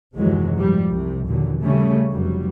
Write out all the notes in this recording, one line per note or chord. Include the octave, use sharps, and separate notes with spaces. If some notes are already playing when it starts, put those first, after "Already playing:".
F#1 D#2 C3 E3 F#3 G#3
G#2 F3 G3
C2 C3
D#2 A#2 D3 E3 F#3
C#3 G3 A3 C#4
F1 F#3 G3